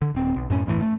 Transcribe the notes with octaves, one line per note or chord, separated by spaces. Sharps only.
D3
D#1 C4
B1
F#2 A2 C#4
G1 E2 A2 E3
A3